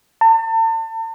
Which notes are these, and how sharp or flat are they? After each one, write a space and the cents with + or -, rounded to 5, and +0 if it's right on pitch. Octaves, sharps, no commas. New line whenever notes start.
A5 +40